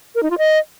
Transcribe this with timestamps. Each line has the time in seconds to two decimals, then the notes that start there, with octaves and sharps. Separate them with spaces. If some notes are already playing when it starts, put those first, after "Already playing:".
0.15 A#4
0.23 D#4
0.30 F4
0.38 D#5